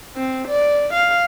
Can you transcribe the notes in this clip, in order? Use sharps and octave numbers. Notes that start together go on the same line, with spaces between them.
C4
D5
F5